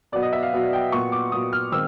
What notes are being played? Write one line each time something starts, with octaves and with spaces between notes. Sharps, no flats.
B2 F#3 B3 D5
D#5
E5
F5
B2 F#3 B3
G5
A#2 F#3 B3 C#6
D6
A#2 F#3 B3 D#6
F6
D#3 G#3 C4 E6